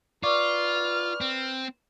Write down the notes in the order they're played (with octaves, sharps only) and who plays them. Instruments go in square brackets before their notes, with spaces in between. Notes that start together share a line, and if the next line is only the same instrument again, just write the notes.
[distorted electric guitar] F4 [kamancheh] B4 F6 [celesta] D5 C#6 D6
[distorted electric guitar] C4